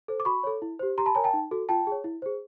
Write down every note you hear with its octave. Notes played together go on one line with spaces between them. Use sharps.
A4 C5
D6
F#4 B5 C#6
A4 C#5
E4
G4 C5
G4 A#5 C6
A5 B5
A#4 C#5 G#5 A#5
G5 A5
D#4
F#4 A4
F4 G5 A5
G#4 C#5
E4
G#4 C5